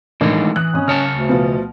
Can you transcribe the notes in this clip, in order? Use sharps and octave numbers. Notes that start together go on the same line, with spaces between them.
A2 D#3 E3 G#3 D4 D#4
E3 D#6 F#6
G#1 C#4 D#6
C#3 C#5 A5 F6
D2
B2 F3 B3